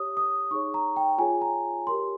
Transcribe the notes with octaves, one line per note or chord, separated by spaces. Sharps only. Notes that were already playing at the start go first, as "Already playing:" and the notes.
Already playing: G4 C#5 D#6
D#6
D#4 G#4 C#5 C#6
A#5
G5
F4 G#4 C#5 G#5
A#5
G4 A#4 C#5 C6